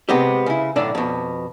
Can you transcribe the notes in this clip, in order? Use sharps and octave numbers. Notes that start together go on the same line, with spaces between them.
C3 G#3 B3 C4 G4
C#3 E4
B1 A2 D3 D4 D5
F2 B2